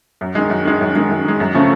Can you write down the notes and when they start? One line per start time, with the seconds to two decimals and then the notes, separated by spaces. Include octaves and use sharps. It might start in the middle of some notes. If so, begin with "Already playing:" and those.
0.21 F#2
0.35 D#3 G#3
0.50 F#2
0.65 D#3 G#3
0.81 F#2
0.96 D#3 G#3
1.10 F#2
1.25 D#3 G#3
1.40 F#2
1.54 C#3 F3 A3 C#4